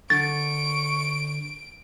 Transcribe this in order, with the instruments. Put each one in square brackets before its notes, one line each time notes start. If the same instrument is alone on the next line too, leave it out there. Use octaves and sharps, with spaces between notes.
[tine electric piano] D3 [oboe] C#6 [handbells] A6 [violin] D7